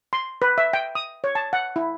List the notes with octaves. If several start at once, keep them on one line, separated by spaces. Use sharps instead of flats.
C6
B4
E5
G5
D#6
C#5
A5
F#5
E4